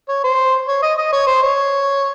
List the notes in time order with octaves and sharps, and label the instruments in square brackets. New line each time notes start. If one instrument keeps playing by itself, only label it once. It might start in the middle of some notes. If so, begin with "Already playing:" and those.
[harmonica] C#5
C5
C#5
D#5
D#5
C#5
C5
C#5